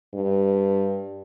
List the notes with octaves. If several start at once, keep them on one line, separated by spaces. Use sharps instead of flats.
G2